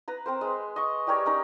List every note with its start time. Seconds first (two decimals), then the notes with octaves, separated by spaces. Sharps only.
0.08 B4 A#5
0.26 C4 A#4 C5
0.41 G#3 B4
0.76 D#5 C#6
1.07 G3 G4 A#4 C#5
1.26 C#4 D#4 A#4